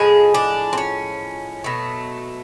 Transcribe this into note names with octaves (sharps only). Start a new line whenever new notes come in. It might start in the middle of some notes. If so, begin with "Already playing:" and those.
Already playing: A2 F3 G#3 G#4
D4
C4
C#4
B2 F#3 A3